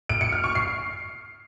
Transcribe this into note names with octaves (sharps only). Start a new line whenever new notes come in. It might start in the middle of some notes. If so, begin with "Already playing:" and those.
D7
C#7
F6
C#6
C7